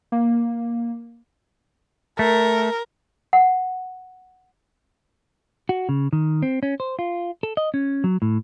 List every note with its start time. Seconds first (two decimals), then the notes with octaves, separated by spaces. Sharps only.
0.12 A#3
2.19 A3 A#4
3.33 F#5
5.69 F#4
5.89 C#3
6.13 D#3
6.43 C4
6.63 C#4
6.80 C5
6.99 F4
7.43 A4
7.57 D#5
7.74 C#4
8.04 F#3
8.22 A2